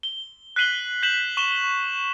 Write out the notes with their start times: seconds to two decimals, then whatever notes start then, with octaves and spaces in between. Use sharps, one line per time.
0.03 G7
0.56 F#6 B6 C7 D#7 F#7 G7
1.03 G6 B6 E7 F#7
1.37 C#6 E7 G7